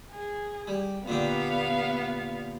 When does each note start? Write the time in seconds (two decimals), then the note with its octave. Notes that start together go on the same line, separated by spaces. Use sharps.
0.12 G#4
0.67 G3
1.08 A#2 D3 B3 G4 F5